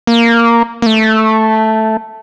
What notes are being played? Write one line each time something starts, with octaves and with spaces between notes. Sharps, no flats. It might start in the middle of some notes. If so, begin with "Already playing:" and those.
A#3
A#3
A3